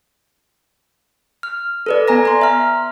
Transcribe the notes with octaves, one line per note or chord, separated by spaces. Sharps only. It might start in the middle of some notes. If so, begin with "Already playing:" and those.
F6
A4 B4 D5
B3 G#5 A#5 A#6
A#5 C6
E5 F6